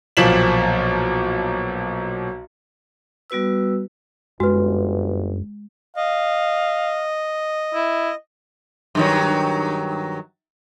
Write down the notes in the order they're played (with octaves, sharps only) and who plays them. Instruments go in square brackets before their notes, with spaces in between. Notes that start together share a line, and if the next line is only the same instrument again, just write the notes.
[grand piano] B1 A#2 F3 B6 E7 F#7
[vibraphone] G3 B3 F#4 B4 E6
[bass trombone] G1 [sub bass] F#2 [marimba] G#3 [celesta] F#4 B4
[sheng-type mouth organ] D#5 [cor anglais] F5
[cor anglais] E4
[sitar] G2 D#3 F#3